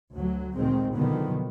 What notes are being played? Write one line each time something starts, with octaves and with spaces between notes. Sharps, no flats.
D2 F#3
D2 A#2 D#3 G#3 C4
B2 D3 D#3 F3 F#3 B3